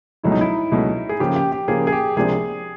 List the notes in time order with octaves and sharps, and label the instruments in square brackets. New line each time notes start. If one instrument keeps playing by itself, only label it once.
[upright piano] C#2 B2 F#3 A3 [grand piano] E4
[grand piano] D#4
E4
[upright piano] C#2 B2 F#3 A3
[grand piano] G#4
[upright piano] C#3 F3 A#3 [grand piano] G4
[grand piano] G4
G4
[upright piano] C#3 F3 A#3 [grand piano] G#4
[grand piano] G#4
G4
[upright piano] C#2 C3 F3 A#3 D4 [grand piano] G#4